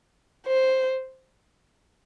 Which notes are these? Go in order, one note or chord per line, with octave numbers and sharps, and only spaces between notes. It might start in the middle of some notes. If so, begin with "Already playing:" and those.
C5